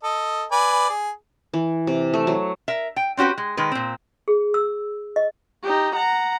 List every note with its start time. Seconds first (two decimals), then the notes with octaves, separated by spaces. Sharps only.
0.03 A4 D#5
0.52 B4 D5 G#5
0.89 G#4
1.54 E3
1.87 C3
2.14 A3
2.27 F#3
2.68 A#4 E5
2.96 G5
3.17 C4 C#4 F#4 G4 B4
3.38 G#3
3.57 D#3 G#3 B4
3.72 A#2 C4
4.28 G#4
4.54 E6
5.16 D#5
5.63 D#4 G4
5.96 F#5 A#5